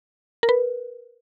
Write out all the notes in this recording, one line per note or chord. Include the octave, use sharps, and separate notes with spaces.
A#4
B4